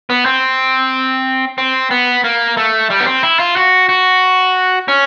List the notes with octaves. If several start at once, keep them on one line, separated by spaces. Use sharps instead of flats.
B3
C4
C4
B3
A#3
A3
G3
B3
C4
E4
F4
F#4
F#4
C#4